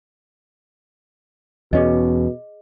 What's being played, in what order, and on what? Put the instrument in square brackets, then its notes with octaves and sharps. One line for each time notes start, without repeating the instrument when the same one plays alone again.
[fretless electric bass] E2 C#4 [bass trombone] B2 [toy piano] G#4 D#5